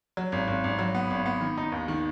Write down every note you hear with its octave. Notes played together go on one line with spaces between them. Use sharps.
F#3
G#1
G#1
G#1
F#3
B3
G#1
B3
D#3
D#4
D#2
D#3